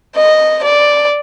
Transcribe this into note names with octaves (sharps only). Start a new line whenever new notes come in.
D#5
D5